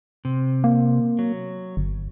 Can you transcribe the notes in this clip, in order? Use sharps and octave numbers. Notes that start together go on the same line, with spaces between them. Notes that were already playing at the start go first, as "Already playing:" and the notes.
C3
A#3
F#3
G1